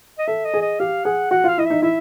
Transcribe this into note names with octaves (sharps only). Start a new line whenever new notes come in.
D#5
A4 E5
D#5
G#4
D#5
G4 F5
G#4 F#5
F#4 F#5
F4 F5
E4 D#5
D#4 E5
E4 E5